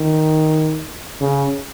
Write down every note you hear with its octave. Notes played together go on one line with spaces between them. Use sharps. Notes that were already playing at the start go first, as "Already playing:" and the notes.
Already playing: D#3
C#3